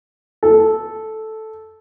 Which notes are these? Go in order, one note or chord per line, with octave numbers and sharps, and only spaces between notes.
A4